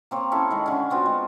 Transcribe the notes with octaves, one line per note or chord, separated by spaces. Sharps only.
A#3 C4 C#5
C#4 E4 A4
D#3 G#3
D3 C#4
B3 C4 F4 F#4
G#3